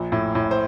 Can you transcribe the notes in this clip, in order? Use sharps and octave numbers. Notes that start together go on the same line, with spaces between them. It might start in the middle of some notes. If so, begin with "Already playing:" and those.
Already playing: A#1
A2
A2
C5